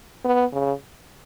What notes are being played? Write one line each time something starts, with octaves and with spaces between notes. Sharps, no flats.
B3
C#3